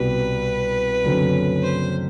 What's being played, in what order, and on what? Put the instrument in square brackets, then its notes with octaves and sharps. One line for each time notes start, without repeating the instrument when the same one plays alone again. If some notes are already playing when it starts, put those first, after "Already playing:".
Already playing: [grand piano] C2 B2 G3 [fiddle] B4
[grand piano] F#1 F#2 D3 F#3 C4
[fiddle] C5